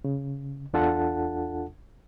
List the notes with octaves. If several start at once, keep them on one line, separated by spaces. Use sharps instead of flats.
C#3
E2 D4 F4 A4 F#5 A5